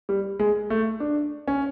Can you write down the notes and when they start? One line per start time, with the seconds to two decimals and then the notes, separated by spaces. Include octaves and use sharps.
0.09 G3
0.39 G#3
0.70 A3
1.00 D4
1.48 C#4